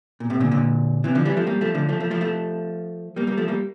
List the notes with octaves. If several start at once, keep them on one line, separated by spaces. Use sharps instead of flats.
A#2
A2 C3
A#2 D3
A#2 D3
C3 E3
D3 F3
E3 G3
F3 A3
G3 A#3
F3 A3
D3 F3
F3 A3
F3 A3
F3 A3
F3 A3
G3 A#3
G3 A#3
F3 A3
G3 A#3